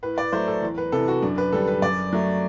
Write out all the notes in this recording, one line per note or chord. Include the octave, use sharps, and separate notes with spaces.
A2 B4
D5
F#3 A3 C5
A4
E2
B4
C3 E3 A4
F#4
F#2 D4
B4
D3 G3 A4
B4
F#2 D5
F#3 A3